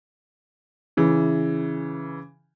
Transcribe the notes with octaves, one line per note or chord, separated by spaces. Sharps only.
C#3 E3